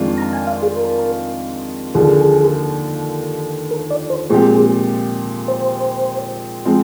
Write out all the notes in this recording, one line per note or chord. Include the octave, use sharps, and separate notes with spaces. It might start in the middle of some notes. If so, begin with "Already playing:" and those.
Already playing: F2 D#3 G#3 D4 F4
A#5
G#5
F5
G#4
A#4
D#2 D3 F3 A#3 G#4
A#4
D5
C5
A#2 F3 G#3 C4 G4 G#4
C5
F3 G#3 C4